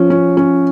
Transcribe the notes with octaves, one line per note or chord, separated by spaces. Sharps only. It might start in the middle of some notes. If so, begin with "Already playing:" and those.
Already playing: F3 C#4
C#4
C#4